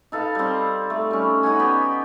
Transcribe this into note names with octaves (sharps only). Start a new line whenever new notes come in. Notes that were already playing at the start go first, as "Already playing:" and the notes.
D#4 A4 B4 F5
G3 C4
A3
G3 C#4
C#4 D#4 F#5 G#5
B3 G4